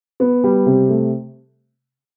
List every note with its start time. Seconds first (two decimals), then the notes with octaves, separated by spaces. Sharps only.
0.20 B3
0.44 G3
0.66 C3
0.89 A3